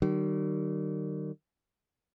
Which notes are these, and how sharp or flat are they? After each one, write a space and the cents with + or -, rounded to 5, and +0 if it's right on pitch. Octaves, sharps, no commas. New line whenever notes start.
D#3 -30 G3 -45